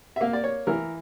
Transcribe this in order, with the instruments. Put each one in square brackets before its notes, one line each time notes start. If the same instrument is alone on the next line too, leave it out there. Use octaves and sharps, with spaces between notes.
[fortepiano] E5
A#3 F5
D5
C#5
E3 A#4